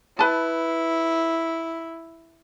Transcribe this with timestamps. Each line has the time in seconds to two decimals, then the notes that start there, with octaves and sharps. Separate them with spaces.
0.19 E4 B4 A5